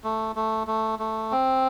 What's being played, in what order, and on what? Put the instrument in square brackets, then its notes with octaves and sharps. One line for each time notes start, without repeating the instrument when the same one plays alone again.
[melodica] A3
A3
A3
A3
C4